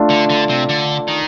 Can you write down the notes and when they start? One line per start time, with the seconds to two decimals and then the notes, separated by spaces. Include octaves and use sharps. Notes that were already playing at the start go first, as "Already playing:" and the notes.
Already playing: A3 D4 F4
0.10 D3
0.30 D3
0.49 C3
0.69 D3
1.08 D#3